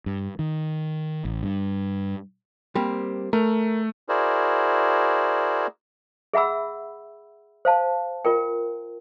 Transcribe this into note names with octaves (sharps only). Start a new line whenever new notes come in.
G2
D#3
A1
G2
G3 A#3 C4
A3 A#4
E4 F#4 G#4 A#4 C5 D5
G#4 E5 F#5 B5 E6
C5 F5 A5
F4 A#4 G5